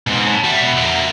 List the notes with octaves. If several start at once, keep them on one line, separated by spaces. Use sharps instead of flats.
G#2 B2 C4
C#5 A5
G3 F#4 E5
B2
D3 A#3